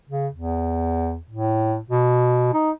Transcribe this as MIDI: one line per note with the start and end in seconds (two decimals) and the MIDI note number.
0.10 0.28 49
0.34 1.19 40
1.30 1.78 45
1.90 2.51 47
2.54 2.71 63